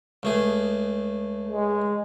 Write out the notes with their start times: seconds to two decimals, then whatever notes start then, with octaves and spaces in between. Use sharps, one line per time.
0.23 C#2 A3 G#4
1.49 G#3